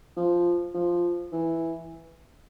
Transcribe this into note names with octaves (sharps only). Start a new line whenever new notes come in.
F3
F3
E3